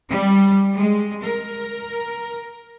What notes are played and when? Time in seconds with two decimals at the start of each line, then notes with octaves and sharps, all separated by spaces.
0.10 G3
0.74 G#3
1.23 A#4